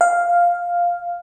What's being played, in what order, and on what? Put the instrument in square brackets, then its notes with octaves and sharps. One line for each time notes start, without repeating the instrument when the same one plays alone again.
[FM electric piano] F5